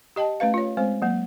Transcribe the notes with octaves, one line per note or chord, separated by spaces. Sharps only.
G4 D#5 G5 A5
A3 C#4 B4 F5
F4 C#5
G#3 C4 C5
F#3 A#3